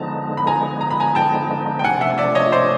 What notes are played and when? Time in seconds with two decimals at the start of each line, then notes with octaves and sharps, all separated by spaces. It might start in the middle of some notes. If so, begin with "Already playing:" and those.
Already playing: D3 F3 G#3 B3 D#4 A5 A#5
0.37 B5
0.47 G#5 A#5
0.81 A#5
0.91 B5
1.00 G#5 A#5
1.15 G5 A5
1.79 G5
1.84 C3 F3 A3 D4 F#5 G#5
2.01 E5 F#5
2.18 D5 E5
2.35 C#5 D#5
2.52 C5 D5